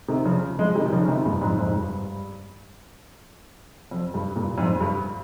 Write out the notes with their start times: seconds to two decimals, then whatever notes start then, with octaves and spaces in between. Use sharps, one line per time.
0.08 C3 D#3
0.25 C#3 F3
0.59 F3 G#3
0.75 D#3 G3
0.86 D#3
0.92 C#3 F3
1.08 C3 D#3
1.25 G2 A#2
1.42 F2 G#2
1.58 F2 G#2
1.76 G2
3.91 F2
4.14 G2
4.36 G2 A#2
4.58 F2 G#2
4.80 G2